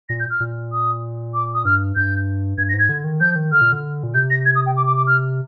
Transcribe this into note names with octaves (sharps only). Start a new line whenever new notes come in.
A#2 A#6
G6
F6
A#2
D#6
D6
D#6
G2 F6
G2 G6
G2 G#6
A#6
G#2
G#6
D3
D#3
F3 G6
D#3
D3 F6
A#2
D3
A#2
C3 G6
A#6
G#6
D#6
G5
D6
D6
D6
F6